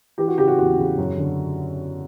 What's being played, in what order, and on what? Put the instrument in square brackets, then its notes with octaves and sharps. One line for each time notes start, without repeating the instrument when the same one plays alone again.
[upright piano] E3 G4
F#4
C#3 G4
F#4
E2 F#4
C#3
F#2
D3